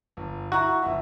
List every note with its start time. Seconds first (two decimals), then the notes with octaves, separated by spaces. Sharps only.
0.17 G1
0.52 E4 F#4 A#5
0.82 G1 E5